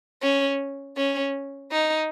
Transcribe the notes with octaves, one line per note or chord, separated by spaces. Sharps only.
C#4
C#4
D#4